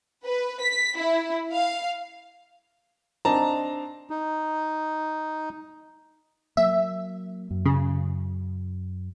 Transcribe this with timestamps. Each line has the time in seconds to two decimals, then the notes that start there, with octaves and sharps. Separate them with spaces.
0.24 B4
0.61 B6
0.96 E4
1.51 F5
3.25 C4 D4 D#4 A5 A#5
4.10 D#4
6.57 F#3 A#3 E5
7.51 F#2
7.66 C#3